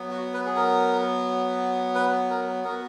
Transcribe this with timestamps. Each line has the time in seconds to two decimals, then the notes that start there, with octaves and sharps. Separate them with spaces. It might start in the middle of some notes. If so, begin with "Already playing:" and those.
Already playing: F#3 B3
0.11 F#4
0.34 B4
0.46 G#4
0.56 A#4
1.95 B4
2.30 A#4
2.64 B3 F#4 A#4